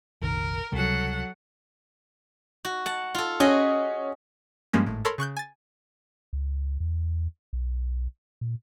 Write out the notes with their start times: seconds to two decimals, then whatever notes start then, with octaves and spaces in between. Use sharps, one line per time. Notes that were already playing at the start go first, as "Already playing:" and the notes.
0.22 F1 A#1 D#3 A#4
0.72 C#2 C3 F#3 G3 A4 F#5
2.65 F#4
2.86 F#5 A5
3.15 F4 A4
3.40 C#4 F#4 G#4 D#5
4.73 G2 F3 G3 G#3 A#3 C#4
4.86 G#1 A2
5.05 A4 A#4 C#5 B5 C6
5.18 C#3 C#6 F#6 G6
5.37 G#5 A6
6.33 C#2
6.80 E2
7.53 B1
8.41 A#2